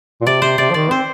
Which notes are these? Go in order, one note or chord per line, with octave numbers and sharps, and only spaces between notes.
A#2
C3 D5
C3 C5
C3 D5
F3
D#3 D5
C4 C5